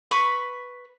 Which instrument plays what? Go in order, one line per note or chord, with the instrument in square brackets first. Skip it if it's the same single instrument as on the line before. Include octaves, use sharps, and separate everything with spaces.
[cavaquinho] B4 B5 C#6